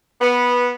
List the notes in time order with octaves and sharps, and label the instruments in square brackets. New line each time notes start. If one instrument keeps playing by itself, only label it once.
[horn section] B3